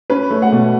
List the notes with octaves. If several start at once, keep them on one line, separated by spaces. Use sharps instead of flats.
C#4 B4
A3
F#5
B2